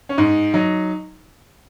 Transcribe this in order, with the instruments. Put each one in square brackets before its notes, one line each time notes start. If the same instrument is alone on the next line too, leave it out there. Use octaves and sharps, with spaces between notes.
[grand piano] C#4
G#2 D#4
F#3 D#4